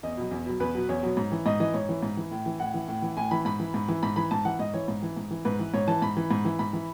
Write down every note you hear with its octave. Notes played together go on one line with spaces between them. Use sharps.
E2 D#5
B2 F#3
E2
B2 F#3
E2 B4
B2 F#3
E2 C#5
B2 F#3
G#2
E3
G#2 D#5
E3 D#5
G#2 C#5
E3
G#2
E3
A2
E3
A2 F#5
E3
A2
E3
A2 G#5
E3 B5
G#2 B5
E3
G#2
E3
G#2 B5
E3 B5
G#2 A5
E3 F#5
G#2 D#5
E3 C#5
G#2
E3
G#2
E3
G#2 B4
E3
G#2 C#5
E3 A5
G#2 B5
E3
G#2
E3
G#2 B5
E3